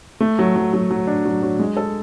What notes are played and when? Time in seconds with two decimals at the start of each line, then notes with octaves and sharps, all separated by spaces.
0.21 A3
0.39 F#3
0.56 F#3
0.74 F#3
0.91 F#3
1.07 D4
1.25 F#3
1.42 F#3
1.60 G#3
1.77 A4